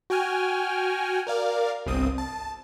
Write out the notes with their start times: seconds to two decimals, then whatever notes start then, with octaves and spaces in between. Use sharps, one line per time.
0.10 F#4 G5 G#5 F6
1.27 A#4 D5 F5
1.86 G1 C2 C4 D#6
2.18 A5